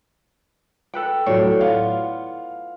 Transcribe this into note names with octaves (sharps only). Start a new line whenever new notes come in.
A4 B4 G5
A2 F#3 A3 C#5 D5
B3 F4 F5